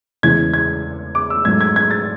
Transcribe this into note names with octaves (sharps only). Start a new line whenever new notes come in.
E2 C#3 E3 G#3 G#6
G#6
D6
E6
G#2 F#3 A3 G#6
G#6
G#6
A6